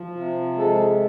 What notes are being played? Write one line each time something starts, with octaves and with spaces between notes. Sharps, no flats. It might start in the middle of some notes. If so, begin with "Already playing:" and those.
Already playing: F3
C3
G#3 A4